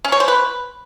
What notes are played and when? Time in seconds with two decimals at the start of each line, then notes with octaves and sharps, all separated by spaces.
0.05 C#4
0.12 C#5
0.20 C5
0.28 B4